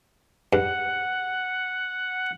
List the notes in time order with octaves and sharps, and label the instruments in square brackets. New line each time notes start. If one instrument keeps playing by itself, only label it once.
[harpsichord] G2 [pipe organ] F#5